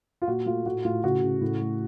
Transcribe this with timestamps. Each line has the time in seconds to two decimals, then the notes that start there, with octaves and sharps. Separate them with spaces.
0.22 F4
0.27 A#2 F#4
0.46 A3 F4
0.65 A2 F#4
0.85 A2 F4
1.03 C#3 F#4
1.23 C#3
1.41 A2
1.61 A3